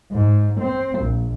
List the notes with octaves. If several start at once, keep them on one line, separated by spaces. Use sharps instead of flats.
G#2
C4
A#1